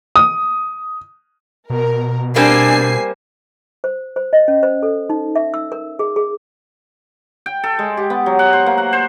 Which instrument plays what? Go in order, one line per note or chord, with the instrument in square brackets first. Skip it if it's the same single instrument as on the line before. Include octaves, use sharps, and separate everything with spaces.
[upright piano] D#6
[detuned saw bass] B2 [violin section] A#4
[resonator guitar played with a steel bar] G3 A#3 C4 [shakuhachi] D4 [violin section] G#5 C7
[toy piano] C5
C5
D#5
C#4
C5
A4
D#4
E5
E6
A#4
G#4
G#4
[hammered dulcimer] G5
A4
G#3
G4
B3
F#3
F#5
C5
A#3
F#5
C5